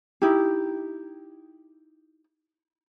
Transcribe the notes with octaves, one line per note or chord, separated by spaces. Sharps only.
D#4 E4 G4